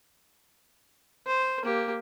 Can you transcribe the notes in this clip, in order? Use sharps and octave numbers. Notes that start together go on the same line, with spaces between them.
C5
A#3 G4